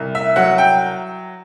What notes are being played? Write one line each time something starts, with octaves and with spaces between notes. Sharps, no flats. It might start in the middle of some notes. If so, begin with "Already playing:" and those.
Already playing: C2
E5
F#3 F#5
G5